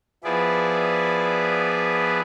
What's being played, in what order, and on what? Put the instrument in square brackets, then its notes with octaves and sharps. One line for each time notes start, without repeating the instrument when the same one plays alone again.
[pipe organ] F3 B3 E4 G#4 B4 D5